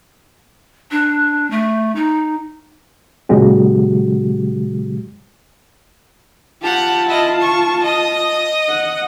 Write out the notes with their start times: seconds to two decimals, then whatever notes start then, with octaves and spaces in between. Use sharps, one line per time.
0.91 D4
1.51 A3
1.96 D#4
3.29 A#2 C#3 F#3 G#3 F#4 G4
6.62 F4 G4 F#5 A5
7.07 E4 D#5
7.40 C#6
7.82 D#5 D#6
8.69 F#5